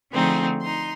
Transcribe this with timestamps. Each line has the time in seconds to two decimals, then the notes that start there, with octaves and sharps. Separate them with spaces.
0.12 D3 F3 A3 C4 D#4 G#4
0.62 D#4 C6